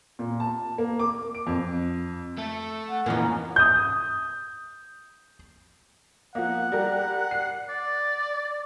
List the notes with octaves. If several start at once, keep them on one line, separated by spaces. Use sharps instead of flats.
A#2
A5
A#3
D6
D7
F2
A3 A4
F#5
F2 A#2 E3 F3 A#3 C#4 D#4
D#6 G6
F3 A#3 F#5
G3 G4 A#4
C7
D5